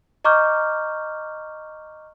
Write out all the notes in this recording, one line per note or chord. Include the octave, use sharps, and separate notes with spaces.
D#5 A#5 C#6 D6 F6 G6